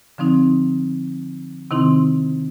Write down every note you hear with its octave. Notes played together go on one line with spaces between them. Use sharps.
D3 F3 C4 D#4
C3 D#3 C4 D#4 E4 C6